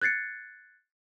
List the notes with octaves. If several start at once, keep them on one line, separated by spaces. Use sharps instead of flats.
F#6 G#6 A6 C7 C#7